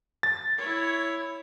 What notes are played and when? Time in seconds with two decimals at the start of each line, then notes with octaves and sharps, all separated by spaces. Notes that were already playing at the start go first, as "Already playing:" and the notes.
0.23 A6
0.58 E4 C#5